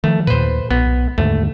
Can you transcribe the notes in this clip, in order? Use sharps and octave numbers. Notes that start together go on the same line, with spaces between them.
D#3 F3 A3
D#2 A#2 B4 C5
B1 B3
D#2 G#2 D3 A3